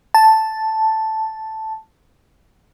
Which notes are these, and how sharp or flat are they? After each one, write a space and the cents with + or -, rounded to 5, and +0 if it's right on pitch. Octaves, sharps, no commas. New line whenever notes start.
A5 +0